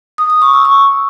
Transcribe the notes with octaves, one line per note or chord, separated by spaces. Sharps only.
D#6
D#6
C#6
E6
C#6